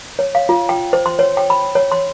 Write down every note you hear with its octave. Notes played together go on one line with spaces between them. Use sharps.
C#5
F5
F4
G5
C5
C6
C#5
G5
B5
C#5
C6